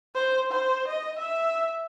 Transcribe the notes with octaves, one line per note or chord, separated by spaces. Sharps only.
C5
C5
D#5
E5